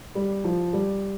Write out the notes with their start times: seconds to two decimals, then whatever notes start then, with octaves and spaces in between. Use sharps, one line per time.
0.15 G3
0.44 F3
0.73 G3